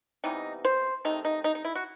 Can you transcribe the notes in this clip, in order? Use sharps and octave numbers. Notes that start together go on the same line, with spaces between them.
C3 E3 G3 B3 D#4
C5
C3 D#3 A3 D#4
D#4
D#4
D#4
E4
F#4